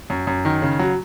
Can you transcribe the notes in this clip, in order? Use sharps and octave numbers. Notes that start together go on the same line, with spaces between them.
F#2
F#2
D#3
C#3
F#3